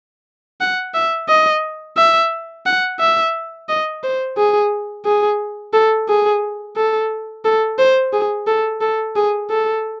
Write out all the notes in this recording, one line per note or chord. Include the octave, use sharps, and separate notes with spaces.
F#5
E5
D#5
E5
F#5
E5
D#5
C5
G#4
G#4
A4
G#4
A4
A4
C5
G#4
A4
A4
G#4
A4